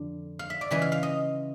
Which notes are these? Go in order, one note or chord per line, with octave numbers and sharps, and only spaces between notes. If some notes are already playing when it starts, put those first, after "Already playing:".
Already playing: F2 D3
F5
E5
D5
C#3 E3 G#3 E5
F5
F5
D#5